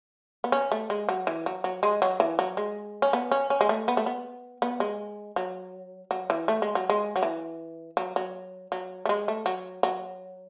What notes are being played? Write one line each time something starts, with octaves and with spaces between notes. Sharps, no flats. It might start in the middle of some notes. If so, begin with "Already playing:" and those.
B3
C#4
A3
G#3
F#3
E3
F#3
F#3
G#3
F#3
E3
F#3
G#3
C#4
B3
C#4
C#4
G#3
A3
B3
A3
B3
B3
G#3
F#3
F#3
E3
A3
G#3
F#3
G#3
F#3
E3
F#3
F#3
F#3
A3
G#3
A3
F#3
F#3